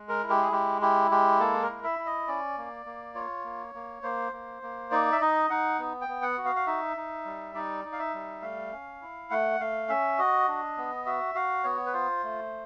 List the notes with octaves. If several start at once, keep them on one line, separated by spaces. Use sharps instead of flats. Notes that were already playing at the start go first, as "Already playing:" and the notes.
Already playing: G#3
A#4
E4
G4
G#4
G#3 G4
E4 G4
G#3 G4
A#3 A4
A#4
E4
E5
E4
D#5
C#4 D5
A#3
A#3
F4 C#5
A#3
A#3
A#3 C5
A#3
A#3
D#4 D5
E5
D#4 D#5
D#4 F#5
B3
G5
B3
F#5
F#4
F5
F5
D#4 E5
D#4
G3
D#4 D5
D#4
F5
E5
G3
A3 F5
C#4
E4
A3 F#5
A3 F5
C#4 E5
F#4 D#5
D4
B3
F#4 E5
F#4 F5
B3 C#5
B4
F4 C5
A3